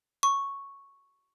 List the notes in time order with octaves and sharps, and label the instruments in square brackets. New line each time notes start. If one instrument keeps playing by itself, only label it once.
[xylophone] C#6